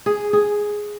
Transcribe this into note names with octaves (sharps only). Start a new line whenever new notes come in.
G#4
G#4